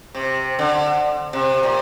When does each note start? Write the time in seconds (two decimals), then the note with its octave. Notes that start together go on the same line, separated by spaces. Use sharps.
0.15 C3
0.59 D3
1.33 C3
1.63 A#2